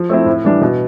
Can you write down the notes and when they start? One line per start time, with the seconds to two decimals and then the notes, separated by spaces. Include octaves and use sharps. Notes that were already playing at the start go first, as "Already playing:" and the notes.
Already playing: F3
0.09 A3 C4 E4
0.26 A2
0.45 E3 G3 D4
0.62 B2